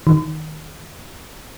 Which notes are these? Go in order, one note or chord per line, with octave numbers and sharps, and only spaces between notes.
D#3